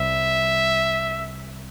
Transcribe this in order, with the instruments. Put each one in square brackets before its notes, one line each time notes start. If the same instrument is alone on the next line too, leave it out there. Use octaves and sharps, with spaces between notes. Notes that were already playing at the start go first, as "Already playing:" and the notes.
Already playing: [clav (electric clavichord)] C2 [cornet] E5